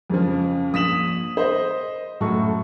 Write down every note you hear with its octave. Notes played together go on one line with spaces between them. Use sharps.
F2 C#3 F3
A#1 D#6 B6 E7 F#7
C5 D#5
F#2 A2 F#4 A4 C#6